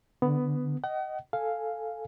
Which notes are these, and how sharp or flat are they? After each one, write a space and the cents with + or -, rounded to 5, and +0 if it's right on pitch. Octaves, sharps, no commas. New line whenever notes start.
D3 +0 B3 +10
D#5 +0 F#5 +40
A4 +0 F5 +0 G#5 +0